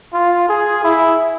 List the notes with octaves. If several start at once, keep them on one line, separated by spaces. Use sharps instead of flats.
F4
G#4
E4